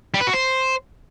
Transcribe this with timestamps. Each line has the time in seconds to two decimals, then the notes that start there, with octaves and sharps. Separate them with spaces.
0.14 G3
0.21 B4
0.27 F#4
0.33 C5